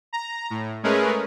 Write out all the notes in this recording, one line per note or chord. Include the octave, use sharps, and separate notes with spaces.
A#5
A2
G#3 A3 C#4 G#4 A#4 B4